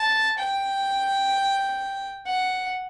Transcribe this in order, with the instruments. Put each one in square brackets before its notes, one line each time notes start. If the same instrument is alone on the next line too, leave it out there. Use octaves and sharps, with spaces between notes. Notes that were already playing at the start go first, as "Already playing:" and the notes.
Already playing: [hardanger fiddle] A5
G5
F#5